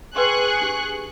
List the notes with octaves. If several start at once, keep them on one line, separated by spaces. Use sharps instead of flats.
G#4 B4 G5 C6 C#6 F#6
D4 G4